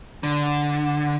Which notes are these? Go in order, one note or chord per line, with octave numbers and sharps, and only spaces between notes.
D3